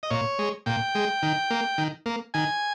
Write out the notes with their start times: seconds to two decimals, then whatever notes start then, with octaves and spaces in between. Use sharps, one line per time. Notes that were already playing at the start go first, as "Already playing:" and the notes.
0.03 D#5
0.10 A#2 C#5
0.39 G#3
0.66 A#2 G5
0.95 G#3
1.23 D#3
1.51 A#3
1.78 D#3
2.06 A#3
2.34 D#3 G#5